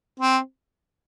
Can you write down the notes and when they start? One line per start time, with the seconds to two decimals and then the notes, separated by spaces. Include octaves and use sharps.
0.20 C4